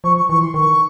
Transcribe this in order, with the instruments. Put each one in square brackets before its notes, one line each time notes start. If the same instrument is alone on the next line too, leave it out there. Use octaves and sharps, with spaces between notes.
[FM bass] F3 [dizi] C#6
[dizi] C#6
[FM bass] E3 [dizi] C#6
[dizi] C6
[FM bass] D#3 [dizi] C#6